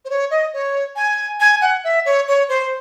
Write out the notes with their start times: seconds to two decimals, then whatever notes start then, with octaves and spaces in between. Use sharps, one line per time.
0.05 C5
0.10 C#5
0.31 D#5
0.53 C#5
0.96 G#5
1.40 G#5
1.61 F#5
1.84 E5
2.06 C#5
2.28 C#5
2.49 C5